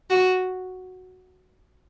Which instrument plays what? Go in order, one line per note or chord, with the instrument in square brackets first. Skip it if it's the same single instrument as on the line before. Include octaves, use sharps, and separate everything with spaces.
[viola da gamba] F#4